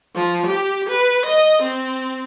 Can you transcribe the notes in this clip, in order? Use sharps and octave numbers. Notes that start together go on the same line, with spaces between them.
F3
G4
B4
D#5
C4